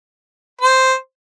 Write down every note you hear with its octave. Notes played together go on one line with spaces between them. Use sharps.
C5